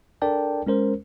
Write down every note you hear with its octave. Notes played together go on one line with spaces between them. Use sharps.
D4 A4 A#4 D5 G5 A5
G#3 C#4 A#4 C5